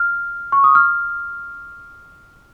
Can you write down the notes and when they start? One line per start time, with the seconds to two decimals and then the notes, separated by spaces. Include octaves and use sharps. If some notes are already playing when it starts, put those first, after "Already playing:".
Already playing: F6
0.52 C#6
0.64 D#6
0.75 F6